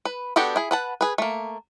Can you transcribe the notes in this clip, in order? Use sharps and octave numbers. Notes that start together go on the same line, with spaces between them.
B4
B3 D4 F#4 G4 A4
E4 G#4
B4 F#5 A5
G#4 B4
A3 A#3